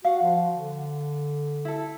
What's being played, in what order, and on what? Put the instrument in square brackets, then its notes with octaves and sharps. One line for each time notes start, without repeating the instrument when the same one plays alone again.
[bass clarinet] F#4 [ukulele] F5 F#5
[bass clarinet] F3
D3
[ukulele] E4 A4